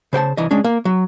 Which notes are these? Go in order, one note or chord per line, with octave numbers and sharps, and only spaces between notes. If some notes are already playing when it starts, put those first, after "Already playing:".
C#3 C5 G5 A5
C2 E3 D#5
G#3 C#4 D4
A#3
F#3